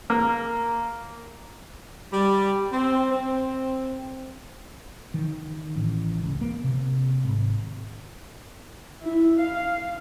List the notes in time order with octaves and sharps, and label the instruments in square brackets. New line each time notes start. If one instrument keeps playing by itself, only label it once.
[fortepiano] A#3
[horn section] G3
C4
C4
[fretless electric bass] D#3
A1
C#2
A#3
C3
G#1
[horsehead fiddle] E4
F5